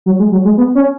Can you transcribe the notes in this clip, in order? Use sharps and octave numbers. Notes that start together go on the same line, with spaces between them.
F#3
G#3
F#3
G#3
B3
C#4